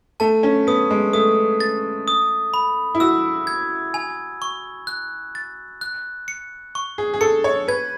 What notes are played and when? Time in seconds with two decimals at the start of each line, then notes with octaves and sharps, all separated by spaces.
0.20 A3 A5
0.43 C#4
0.67 B3 D#6
0.90 G#3
1.13 A3 D#6
1.60 A6
2.08 D#6
2.54 B5
2.95 E4
3.00 F#4 E6
3.47 G#6
3.94 G#5
4.42 C#6
4.87 F#6
5.35 A6
5.81 F#6
6.28 C#7
6.75 C#6
6.98 G#4
7.14 G#4
7.21 A4 C#7
7.44 C#5
7.68 B4 G#6